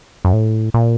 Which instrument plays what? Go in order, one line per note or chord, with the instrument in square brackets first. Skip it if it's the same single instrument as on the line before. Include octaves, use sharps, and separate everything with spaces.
[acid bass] F#2
A2
A#2